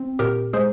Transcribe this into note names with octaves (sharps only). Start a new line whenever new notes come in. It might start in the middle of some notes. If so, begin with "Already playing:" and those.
Already playing: C4
A#2 G4 A#4
G#3 G#4 C5